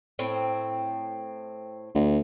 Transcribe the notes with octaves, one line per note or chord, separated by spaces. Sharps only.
A2 C4
D2